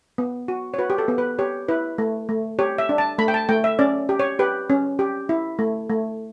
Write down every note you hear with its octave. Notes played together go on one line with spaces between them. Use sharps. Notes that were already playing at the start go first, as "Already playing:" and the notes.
B3
F#4
C#5
F#4 B4
G4
A4
B3
B4
G4 C#5
E4 B4
A3
A3
G4 C#5
E5
D4
A5
A3 B5
G5
A5
A3 G5
E5
C#4 D5
G4
C#5
G4 B4
C#4
G4
E4
A3
A3